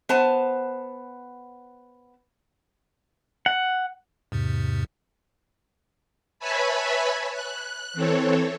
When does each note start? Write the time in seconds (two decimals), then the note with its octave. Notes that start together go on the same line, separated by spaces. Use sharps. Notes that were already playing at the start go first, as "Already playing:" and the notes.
0.09 B3 C5 A5
3.46 F#5
4.32 E2 G#2 C3
6.39 B4 C#5 E5 G#5 A5 B5
7.32 F#6
7.94 E3 C4 A4 C#5